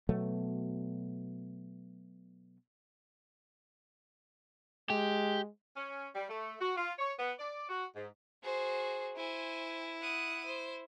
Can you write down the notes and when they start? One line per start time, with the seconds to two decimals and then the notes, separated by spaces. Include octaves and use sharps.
0.09 B2 F#3 A3 B3
4.90 G#3 G4
5.77 C#4
6.15 G3
6.29 A3
6.60 F#4
6.77 F4
6.99 C#5
7.19 B3
7.39 D5
7.69 F#4
7.96 G#2
8.43 F#4 G#4 C5
9.17 E4 C5 G#5
10.01 F#5 D#6
10.46 C5